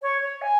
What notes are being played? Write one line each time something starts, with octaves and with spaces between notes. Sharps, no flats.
C#5
C#5
G#5